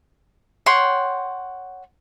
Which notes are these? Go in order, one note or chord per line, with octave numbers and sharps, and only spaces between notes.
C#5 F#5 G5 C6